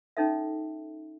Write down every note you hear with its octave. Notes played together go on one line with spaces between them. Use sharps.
C#4 D#4 A4 E5